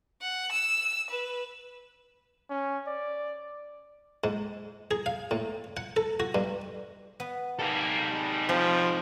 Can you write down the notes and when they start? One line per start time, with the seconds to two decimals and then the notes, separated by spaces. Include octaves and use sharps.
0.21 F#5
0.51 E6
1.10 B4
2.50 C#4
2.87 D5
4.24 G#2
4.91 G#4
5.06 F5
5.31 A2
5.77 F#5
5.96 A4
6.20 F#4
6.35 G2
7.20 B3
7.59 G#2 G3 A#3 D#4 A4
8.11 G3 G#3
8.49 F3 C4